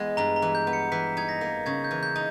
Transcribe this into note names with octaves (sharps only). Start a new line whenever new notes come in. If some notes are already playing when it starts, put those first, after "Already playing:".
Already playing: E3 G#3 B3
G2 A#5
A#5
E3
G6
B3
C#7
E3 B6
D#4 G#6
A#6
A#3
C#3 G#6
G6
E3
G6
D#4